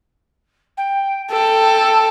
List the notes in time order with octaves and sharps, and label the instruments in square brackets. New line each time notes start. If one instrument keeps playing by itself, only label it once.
[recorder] G5
[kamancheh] A4 [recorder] G5